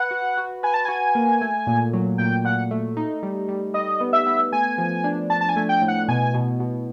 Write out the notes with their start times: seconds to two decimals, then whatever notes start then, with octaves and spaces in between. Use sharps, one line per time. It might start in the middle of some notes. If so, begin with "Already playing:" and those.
Already playing: B4 F#5
0.11 F#4
0.37 F#4
0.63 B4 G#5
0.74 A5
0.85 F#4 G#5
1.15 A#3
1.41 A3
1.67 A#2
1.93 F#3
2.18 A#2 G5
2.44 A#2 F#5
2.71 A3
2.97 D#4
3.23 G3
3.48 G3
3.74 G3 D#5
4.01 B3
4.13 E5
4.27 B3
4.52 A3 G#5
4.78 F3
5.04 D4
5.30 D4 A5
5.41 A5
5.49 G#5
5.56 A3
5.69 G5
5.82 A2
5.88 F#5
6.09 B2 G#5
6.34 B2
6.60 B2